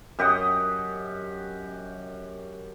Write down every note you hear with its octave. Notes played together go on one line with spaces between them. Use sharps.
F#2 G4 D#5 F#5